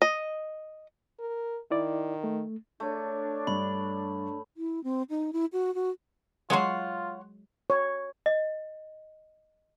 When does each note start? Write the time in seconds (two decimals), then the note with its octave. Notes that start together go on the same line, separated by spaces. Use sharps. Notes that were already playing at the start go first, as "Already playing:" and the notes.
0.02 D#5
1.19 A#4
1.71 D#3 E4 D5
2.24 A3
2.80 A3 D4 C#5
3.47 G2 B5
4.57 E4
4.84 C4
5.10 D#4
5.33 E4
5.53 F#4
5.75 F#4
6.50 F#3 G#3 F4 C#5 F#5 C6
7.70 C#5
8.26 D#5